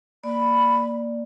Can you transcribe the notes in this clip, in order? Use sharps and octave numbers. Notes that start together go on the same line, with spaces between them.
A#3 D5 B5